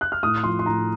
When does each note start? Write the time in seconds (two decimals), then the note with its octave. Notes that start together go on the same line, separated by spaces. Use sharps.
0.01 F#6
0.12 F6
0.23 A2 D#6
0.44 F3 C6
0.59 C6
0.66 A2 A#5